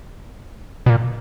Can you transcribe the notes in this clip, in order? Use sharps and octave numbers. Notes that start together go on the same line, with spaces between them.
B2
A#2